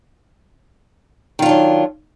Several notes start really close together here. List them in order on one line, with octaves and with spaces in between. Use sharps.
D#3 F4 D4 F#3